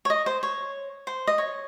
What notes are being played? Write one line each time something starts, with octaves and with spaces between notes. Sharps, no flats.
C#5
D#5
C5
C#5
C5
D#5
C#5